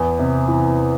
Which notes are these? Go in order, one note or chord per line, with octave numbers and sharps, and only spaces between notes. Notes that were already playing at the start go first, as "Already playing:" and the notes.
Already playing: E2
C3
E3